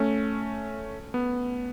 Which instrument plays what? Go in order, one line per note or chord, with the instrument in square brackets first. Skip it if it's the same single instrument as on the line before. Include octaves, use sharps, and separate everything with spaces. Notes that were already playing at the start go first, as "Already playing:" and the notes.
Already playing: [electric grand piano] A3 C#4
B3